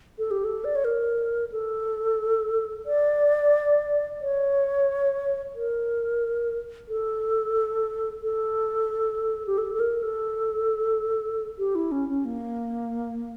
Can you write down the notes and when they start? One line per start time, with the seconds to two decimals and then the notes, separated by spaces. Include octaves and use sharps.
0.19 A4
0.31 G4
0.45 A4
0.65 D5
0.75 C#5
0.85 A#4
1.52 A4
2.86 D5
4.21 C#5
5.55 A#4
6.89 A4
8.23 A4
9.47 G4
9.58 A4
9.74 A4
9.80 A#4
10.03 A4
11.58 G4
11.75 E4
11.92 C#4
12.09 C#4
12.25 A#3